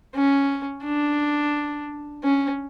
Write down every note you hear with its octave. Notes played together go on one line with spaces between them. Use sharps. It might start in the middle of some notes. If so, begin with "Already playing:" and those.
C#4
D4
C#4